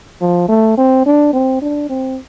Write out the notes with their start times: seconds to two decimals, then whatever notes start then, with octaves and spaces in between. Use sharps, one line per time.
0.21 F3
0.49 A3
0.78 C4
1.06 D4
1.33 C4
1.62 D4
1.89 C4